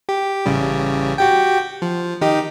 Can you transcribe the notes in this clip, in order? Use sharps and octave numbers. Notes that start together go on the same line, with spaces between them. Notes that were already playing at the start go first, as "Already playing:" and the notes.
G4
A1 C#3 G3
F#4 G4 G5
F3
D#3 D#4 G4